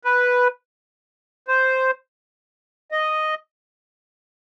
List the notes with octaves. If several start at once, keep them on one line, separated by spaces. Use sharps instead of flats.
B4
C5
D#5